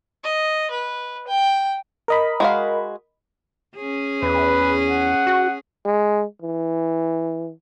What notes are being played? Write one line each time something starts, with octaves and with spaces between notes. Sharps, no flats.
D#5
B4
G5
A#4 D#5 B5
G#3 F#4 F5
C#4 G#4
E2 B4
F#5
F#4
G#3
E3